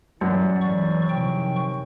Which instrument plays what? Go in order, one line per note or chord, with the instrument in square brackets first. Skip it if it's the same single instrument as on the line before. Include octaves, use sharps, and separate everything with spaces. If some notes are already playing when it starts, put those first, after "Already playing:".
[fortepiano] F#2 [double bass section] E3 G3 [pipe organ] D5 F#5
[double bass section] G#2 E3 [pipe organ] D5 C#6
[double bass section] C3 D#3 [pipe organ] F3 G5 C#6